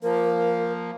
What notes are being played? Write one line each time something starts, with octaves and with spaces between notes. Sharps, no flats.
F3 A#3 A#4